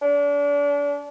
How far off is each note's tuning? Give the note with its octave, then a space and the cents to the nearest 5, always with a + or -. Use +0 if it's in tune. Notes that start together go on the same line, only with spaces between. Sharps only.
D4 -35